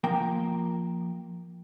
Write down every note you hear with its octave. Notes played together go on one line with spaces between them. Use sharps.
F3 A#3 A#4 G5